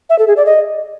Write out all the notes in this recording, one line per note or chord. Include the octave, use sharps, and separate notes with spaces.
E5
A4
G#4
D5
D#5